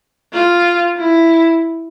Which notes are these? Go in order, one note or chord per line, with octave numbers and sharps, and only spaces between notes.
F4
E4